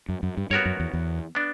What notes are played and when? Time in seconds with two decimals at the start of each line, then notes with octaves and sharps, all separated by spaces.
0.09 F#2
0.23 F#2
0.37 G2
0.51 G2 B3 F#4 A#4 C#5
0.66 F#2
0.80 E2
0.93 E2
1.35 B3 D4